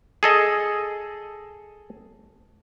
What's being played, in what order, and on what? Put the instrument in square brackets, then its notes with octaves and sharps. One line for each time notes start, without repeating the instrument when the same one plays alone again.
[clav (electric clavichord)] G#4 A4 D#5